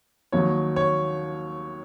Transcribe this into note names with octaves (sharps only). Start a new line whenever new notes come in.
D#2 D#3 F#3 C#5
C#5